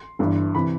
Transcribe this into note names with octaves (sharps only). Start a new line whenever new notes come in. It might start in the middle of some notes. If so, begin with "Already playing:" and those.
Already playing: C6
G1 G2 E3
C3 E3 B5